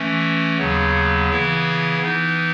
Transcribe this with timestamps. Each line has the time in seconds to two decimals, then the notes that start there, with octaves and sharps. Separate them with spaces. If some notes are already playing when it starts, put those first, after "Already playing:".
Already playing: E3 A3 C#4
0.58 D#2 C#3 F#3 B3
1.30 C#3 E3 B3 E4
2.01 E3 B3 D#4